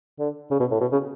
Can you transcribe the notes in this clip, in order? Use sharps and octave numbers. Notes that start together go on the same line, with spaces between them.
D3
C#3
B2
A2
B2
C#3